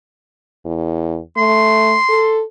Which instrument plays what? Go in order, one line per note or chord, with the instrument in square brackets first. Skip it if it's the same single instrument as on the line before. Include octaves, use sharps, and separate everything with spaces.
[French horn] E2
[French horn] A3 [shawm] C6
[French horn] A4